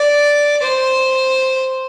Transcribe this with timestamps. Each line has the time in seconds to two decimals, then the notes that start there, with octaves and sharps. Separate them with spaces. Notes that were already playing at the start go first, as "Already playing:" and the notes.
Already playing: D5
0.62 C5